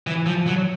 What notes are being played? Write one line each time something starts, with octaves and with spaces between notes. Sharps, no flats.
E3
F3
F#3